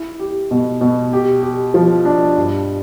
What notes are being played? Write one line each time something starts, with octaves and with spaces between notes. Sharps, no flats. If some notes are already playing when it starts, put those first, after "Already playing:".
Already playing: E4
G4
B2
B2
G4
G4
F3
D4
G2